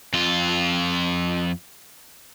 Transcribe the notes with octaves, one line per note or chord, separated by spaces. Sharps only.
F2 F4